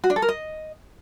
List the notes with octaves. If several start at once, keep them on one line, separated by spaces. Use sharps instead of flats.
F#4
D4
A4
A#4
D#5